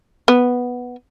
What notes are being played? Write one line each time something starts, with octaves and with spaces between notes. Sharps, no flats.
B3